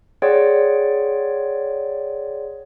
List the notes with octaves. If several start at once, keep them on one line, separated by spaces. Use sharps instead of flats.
G#4 C#5 D5 F#5 G5 C6